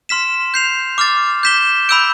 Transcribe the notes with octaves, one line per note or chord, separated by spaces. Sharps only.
C6 F6 B6 E7
G6 C7 F7
D6 F6 A6
G6 B6 E7 G7
B5 E6 G6 D7